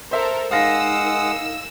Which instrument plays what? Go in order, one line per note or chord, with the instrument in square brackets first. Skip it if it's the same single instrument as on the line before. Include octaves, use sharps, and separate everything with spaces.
[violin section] A4 A#4 [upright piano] C5 E5
[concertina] G#3 F#5 D#6 [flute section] D#4 A#4 [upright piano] F5 A#6 [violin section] E6